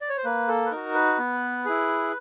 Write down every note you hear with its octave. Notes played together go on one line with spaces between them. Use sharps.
D5
C#5
C5
A#3 B4
A4
B4
D#4 F#4 A#4
B4
B3
E4 G#4